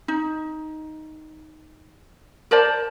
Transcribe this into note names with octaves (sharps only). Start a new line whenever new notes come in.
D#4
A#4 C5 D5 A5